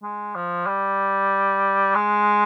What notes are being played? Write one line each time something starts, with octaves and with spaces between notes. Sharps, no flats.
G#3
F3
G3
G#3